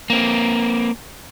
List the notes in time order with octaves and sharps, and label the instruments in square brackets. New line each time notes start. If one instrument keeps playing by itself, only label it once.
[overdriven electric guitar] A#3 C4